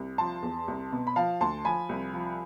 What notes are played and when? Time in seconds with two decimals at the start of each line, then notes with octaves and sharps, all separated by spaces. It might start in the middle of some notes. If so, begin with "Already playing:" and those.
Already playing: C2
0.18 F3 A5 C6
0.43 E2
0.68 C2
0.92 B2
1.07 B5
1.16 F3 F5 A5
1.41 D2 A5 C6
1.65 F3 G#5 B5
1.89 C2
2.13 F3